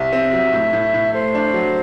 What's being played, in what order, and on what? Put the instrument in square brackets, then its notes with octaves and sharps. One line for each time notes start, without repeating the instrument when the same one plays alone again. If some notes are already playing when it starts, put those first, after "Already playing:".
Already playing: [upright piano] C2 [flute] E5
[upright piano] C4
F#3
A2
A2
A2
[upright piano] A3 [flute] C5
[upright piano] D4
F#3